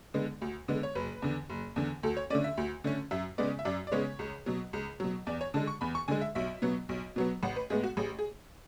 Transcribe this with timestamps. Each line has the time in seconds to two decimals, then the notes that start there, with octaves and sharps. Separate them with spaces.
0.14 D3 G#3 B3
0.42 D2
0.68 D3 G#3 B3
0.83 C#5
0.95 F#1 B4
1.22 E2 D3
1.50 F#1
1.76 E2 D3
2.03 D2 A4
2.17 C#5
2.30 D3 A3 C#4 D5
2.44 E5
2.57 D2
2.84 D3 A3 C#4
3.11 F#2 E5
3.38 C#3 G#3 B3 D5
3.59 E5
3.65 F#2 D5
3.87 D5
3.92 C#3 G#3 B3 C#5
4.19 C#2
4.46 B2 F#3
4.73 C#2
5.00 B2 F#3
5.27 E2 D5
5.41 C#5
5.54 D3 G#3 A5
5.67 C#6
5.81 E2 B5
5.95 C#6
6.08 D3 G#3 G#5
6.21 E5
6.35 B1 E5
6.62 B2 F#3 B3
6.89 B1
7.16 B2 F#3 B3
7.43 A1 F#5
7.56 B4
7.70 A2 G#3 B3 G#4
7.84 F#4
7.97 A1 G#4
8.19 G#4